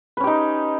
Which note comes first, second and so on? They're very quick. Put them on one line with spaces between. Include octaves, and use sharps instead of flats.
B4 C#4 G4 D#4